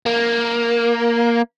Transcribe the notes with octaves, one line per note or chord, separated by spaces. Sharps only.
A#3